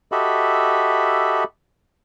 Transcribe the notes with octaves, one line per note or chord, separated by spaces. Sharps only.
F#4 G4 A4 D#5 E5 B5